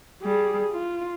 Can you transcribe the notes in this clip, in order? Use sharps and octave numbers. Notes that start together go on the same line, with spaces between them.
G3 G#4
F4